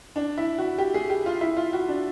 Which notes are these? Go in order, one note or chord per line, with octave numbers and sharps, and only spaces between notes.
D4
E4
F#4
G4
G#4
G4
F4
E4
F4
F#4
D4